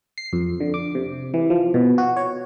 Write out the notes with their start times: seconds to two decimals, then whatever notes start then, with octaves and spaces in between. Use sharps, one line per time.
0.18 C7
0.33 F2
0.60 D3
0.74 D6
0.95 C3
1.34 E3
1.50 F3
1.74 B2
1.98 F#4
2.17 C#5